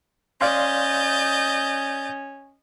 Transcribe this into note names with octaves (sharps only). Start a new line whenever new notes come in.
C#4 D5 D#5 F5 C6 G6 A6